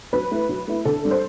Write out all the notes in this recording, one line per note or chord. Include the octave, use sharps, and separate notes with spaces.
F#3 B4
A3 E4
F#3
A3 E4
D3 A4
G3 D4
C5